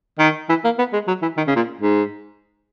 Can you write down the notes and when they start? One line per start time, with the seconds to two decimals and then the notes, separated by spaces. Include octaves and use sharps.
0.19 D#3
0.49 E3
0.64 A#3
0.78 B3
0.93 G#3
1.08 F#3
1.22 E3
1.37 D#3
1.47 C#3
1.56 A#2
1.81 G#2